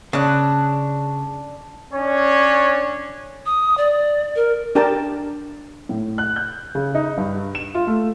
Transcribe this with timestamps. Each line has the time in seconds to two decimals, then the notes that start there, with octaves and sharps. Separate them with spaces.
0.13 C#3 D4 F#6
1.94 C#4 D4 C#5
3.46 D#6
3.78 D5
4.36 A#4
4.75 D4 G4 A#4 G5 A5
5.89 A2
6.18 F#6
6.36 G6
6.75 C#3
6.95 D#4
7.17 G2
7.55 E7
7.75 F4
7.87 A3